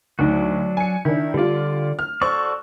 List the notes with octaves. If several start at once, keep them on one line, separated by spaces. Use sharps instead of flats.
D2 F#3 D4 D#4 F#4
G#5 C#7
D#3 D4 E4
D3 G3 F4 D5
F6
F#4 A4 C5 D5 C#6